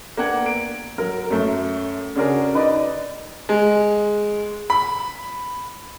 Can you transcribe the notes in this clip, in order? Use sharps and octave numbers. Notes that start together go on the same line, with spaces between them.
A#3 B3 D4 F#5 G5 G#6
D7
F#3 A#4
F#2 A3
C#3 C#4 D4 F#4 G#4 A#4
D#4 B4 D5 D#5
G#3
B5